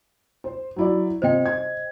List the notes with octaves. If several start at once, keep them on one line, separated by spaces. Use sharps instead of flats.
C5
F#3 E4 D5
C3 F4 C5 D#5 G5
G#6